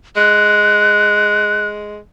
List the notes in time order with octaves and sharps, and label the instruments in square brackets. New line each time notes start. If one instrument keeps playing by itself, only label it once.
[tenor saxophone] G#3 [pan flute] F#6